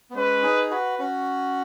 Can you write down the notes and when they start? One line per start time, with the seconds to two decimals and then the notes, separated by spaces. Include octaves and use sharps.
0.10 B3
0.15 G#3 C#4 B4
0.43 D#4 G#4
0.71 F#4 B4
0.99 C#4 F#4